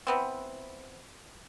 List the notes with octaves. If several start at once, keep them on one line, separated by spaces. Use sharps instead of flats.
E3 B3 C4